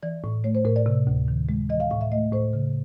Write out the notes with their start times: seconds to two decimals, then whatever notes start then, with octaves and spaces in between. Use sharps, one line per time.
0.03 E3 D5
0.24 A2
0.44 A3 C#5
0.55 C5
0.65 A2 A#4
0.76 D5
0.86 C3
1.07 D2
1.28 D#3
1.49 G#3
1.69 E3 D#5
1.80 F5
1.91 A2 F5
2.01 E5
2.12 A3 D#5
2.33 A2 C5
2.53 C#3